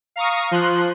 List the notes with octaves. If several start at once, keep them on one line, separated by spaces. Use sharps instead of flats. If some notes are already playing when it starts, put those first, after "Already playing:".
F5 A#5 C#6 D#6
F3 C6 F#6